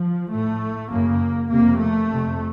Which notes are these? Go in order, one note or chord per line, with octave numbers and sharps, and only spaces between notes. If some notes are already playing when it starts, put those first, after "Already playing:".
Already playing: F3
A2 A3
F#2 C#3 A#3
F2 C3 A#3
A3
F2 C3